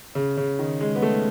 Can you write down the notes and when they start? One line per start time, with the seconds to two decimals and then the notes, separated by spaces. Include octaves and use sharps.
0.15 C#3
0.37 C#3
0.59 D#3
0.81 G#3
0.96 B3
1.02 A3